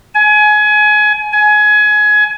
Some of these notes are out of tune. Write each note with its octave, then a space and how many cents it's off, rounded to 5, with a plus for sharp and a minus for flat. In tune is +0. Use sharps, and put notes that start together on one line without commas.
G#5 +25
G#5 +25